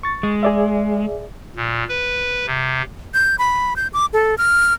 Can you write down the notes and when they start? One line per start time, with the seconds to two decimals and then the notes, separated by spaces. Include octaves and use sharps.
0.03 C#6 A6
0.23 G#3
0.43 G#4 D5 E5
1.56 A#2
1.89 B4
2.47 C3
3.14 G6
3.39 B5
3.76 G6
3.94 D6
4.13 A4
4.38 F6